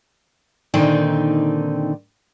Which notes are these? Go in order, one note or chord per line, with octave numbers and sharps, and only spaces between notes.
A#2 D3 D#3 C4 D#4